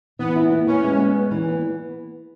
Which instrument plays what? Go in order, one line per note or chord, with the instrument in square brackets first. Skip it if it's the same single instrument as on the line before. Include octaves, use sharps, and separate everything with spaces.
[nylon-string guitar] E3 [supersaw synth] B3
[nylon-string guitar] E4
B3
[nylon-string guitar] B3 [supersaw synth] C#4
[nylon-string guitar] G#3
B3
B3
E3
B3